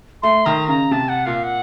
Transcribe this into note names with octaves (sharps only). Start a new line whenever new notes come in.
A3 C6
D#3 A#5
C#3 A#5
C3 A5
F#5
A#2 F5
F#5